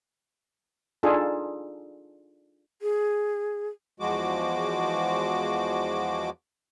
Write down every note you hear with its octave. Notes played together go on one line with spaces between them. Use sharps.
D4 D#4 F4 G#4 A4
G#4
E2 F3 G#3 F#4 D6